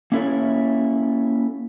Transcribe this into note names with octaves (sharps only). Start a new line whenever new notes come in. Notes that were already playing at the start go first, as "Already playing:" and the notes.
A#3 C#4 E4 G#4 A4 C#5